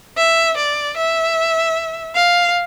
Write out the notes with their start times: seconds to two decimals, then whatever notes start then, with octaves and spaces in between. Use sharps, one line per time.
0.17 E5
0.57 D5
0.97 E5
2.16 F5